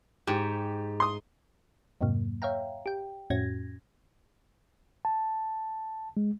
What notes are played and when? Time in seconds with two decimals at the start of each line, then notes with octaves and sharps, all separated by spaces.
0.27 G#2 G4
1.00 C6 D#6
2.01 F2 G#2 C3 F#3 A#3
2.42 C#5 E5 F5 G5 A#5
2.86 G4 G5
3.30 F2 A2 C#4 F#4 G#6 A#6
5.05 A5
6.17 G#3